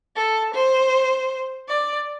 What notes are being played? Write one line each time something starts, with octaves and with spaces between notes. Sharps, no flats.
A4
C5
D5